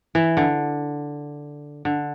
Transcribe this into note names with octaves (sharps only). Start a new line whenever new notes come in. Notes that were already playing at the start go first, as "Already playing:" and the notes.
E3
D3
D3